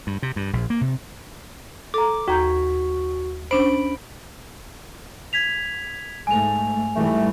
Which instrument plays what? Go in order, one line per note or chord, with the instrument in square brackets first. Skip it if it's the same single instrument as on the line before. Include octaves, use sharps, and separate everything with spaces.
[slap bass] G2
C3
G2
A#1
A#3
C3
[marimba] A4 A#5 [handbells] D6
[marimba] D#2 A#5 G6 [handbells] F#4
[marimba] C#4 D4 C5 [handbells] B5 D7
[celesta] G#6 B6 F7
[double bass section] G#2 A3 [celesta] G#5 F7
[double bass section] G#2 E3 G3 [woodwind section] A3